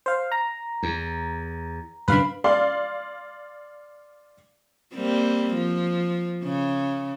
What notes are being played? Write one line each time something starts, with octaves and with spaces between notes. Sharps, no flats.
C5 F5
A#5
E2
F#2 C#3 D4 B4 F5 B5
D5 F5 C6
G3 A#3 C4
F3
C#3